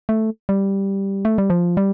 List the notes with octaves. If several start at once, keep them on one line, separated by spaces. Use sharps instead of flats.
A3
G3
A3
G3
F3
G3